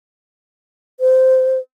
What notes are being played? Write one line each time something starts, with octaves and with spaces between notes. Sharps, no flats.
C5